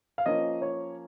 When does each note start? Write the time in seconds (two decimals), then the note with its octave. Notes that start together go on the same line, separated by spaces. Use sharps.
0.18 F5
0.26 F3 A#3 C#4 D#5
0.62 C#5